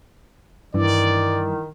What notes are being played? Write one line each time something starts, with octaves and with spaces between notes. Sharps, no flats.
G2 D#3 E3 D5